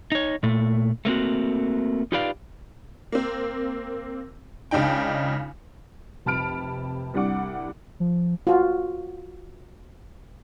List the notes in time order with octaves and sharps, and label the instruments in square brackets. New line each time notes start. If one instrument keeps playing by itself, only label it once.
[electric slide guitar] D#4 C#5
A#2 A3
A3 A#3 C4 F#4
D#4 F4 G4 B4 D5 F5
[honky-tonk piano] A#3 C4
C#2 C#3 D4 D#4 G5
F1 C3 A5 B5 F6 D7
C2 G3 D4 F#5 D6
[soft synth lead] F3
[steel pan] F4 F#4